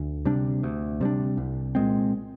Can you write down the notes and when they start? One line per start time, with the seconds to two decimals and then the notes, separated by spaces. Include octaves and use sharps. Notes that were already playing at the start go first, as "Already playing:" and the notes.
Already playing: D2
0.25 C3 G3 D4
0.63 D2
1.01 C3 G3 D4
1.37 C2
1.75 A#2 G#3 C4